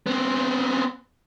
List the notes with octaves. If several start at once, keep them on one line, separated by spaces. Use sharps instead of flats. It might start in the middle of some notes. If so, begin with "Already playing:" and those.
B3 C4